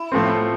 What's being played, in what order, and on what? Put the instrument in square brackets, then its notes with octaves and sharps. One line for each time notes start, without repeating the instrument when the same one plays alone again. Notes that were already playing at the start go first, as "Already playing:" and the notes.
Already playing: [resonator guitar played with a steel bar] E4
[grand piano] A2 F3 A3 C4